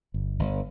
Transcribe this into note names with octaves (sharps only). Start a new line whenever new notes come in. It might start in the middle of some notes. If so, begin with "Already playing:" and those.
G1
G1